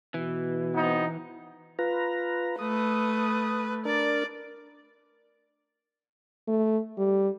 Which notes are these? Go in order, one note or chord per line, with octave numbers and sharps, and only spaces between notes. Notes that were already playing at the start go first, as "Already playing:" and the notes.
B2 E3
B3 C4 D#4
F4 B4 A#5
A3 B4 D#6
D4 A#4 D5
A3
G3